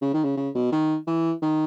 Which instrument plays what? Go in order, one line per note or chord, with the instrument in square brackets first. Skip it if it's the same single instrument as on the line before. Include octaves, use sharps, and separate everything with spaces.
[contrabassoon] C#3
D#3
C#3
C#3
B2
D#3
E3
D#3